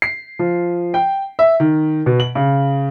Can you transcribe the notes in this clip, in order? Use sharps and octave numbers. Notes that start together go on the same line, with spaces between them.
C7
F3
G5
E5
D#3
B2
F#7
C#3